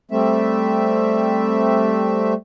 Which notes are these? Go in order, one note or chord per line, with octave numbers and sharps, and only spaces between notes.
G3 A3 C4 E5